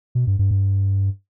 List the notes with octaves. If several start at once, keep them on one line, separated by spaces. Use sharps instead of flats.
B2
G2
G2
G2